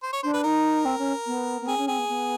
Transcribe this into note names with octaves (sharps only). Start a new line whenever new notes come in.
C5
C#5
D4 C5
B4
D#4 A#4
C4
C#4
B3
B3
C4 G#4
C#4
C4 G#4
B3
B3